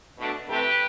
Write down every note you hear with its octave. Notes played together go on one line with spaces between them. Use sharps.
B2 A3 D4
C3 E3 A3 C4 G4 B4